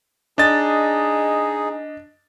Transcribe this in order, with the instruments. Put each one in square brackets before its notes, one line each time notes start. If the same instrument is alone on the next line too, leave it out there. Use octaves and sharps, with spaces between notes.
[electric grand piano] D4 D#5 A6 [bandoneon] D#4 G#4